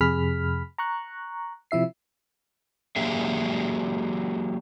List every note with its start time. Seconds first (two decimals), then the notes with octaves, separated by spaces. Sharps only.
0.01 F2 C3 G#4 B5 F6 B6
0.78 A#5 C#6 F#6
1.71 C3 F3 E4 E5 C7
2.96 F#3 A#3 G4 G#4 E5